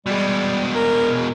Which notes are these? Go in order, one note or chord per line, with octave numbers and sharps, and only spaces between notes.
B2 G3 G#3
A#4